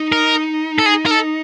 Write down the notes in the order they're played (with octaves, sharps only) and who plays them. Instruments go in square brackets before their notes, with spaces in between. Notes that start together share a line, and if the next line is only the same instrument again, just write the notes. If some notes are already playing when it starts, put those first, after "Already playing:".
Already playing: [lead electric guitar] D#4
[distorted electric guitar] A#4
A4
G#4
A#4
A4